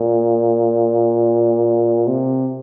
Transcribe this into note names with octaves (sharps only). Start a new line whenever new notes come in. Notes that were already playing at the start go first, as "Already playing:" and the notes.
Already playing: A#2
C3